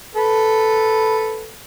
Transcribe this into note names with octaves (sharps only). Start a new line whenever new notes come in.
A4 B4